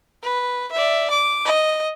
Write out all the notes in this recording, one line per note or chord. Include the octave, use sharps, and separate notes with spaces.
B4
D5 E5
D6
D#5